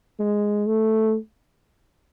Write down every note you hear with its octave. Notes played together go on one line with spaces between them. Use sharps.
G#3
A3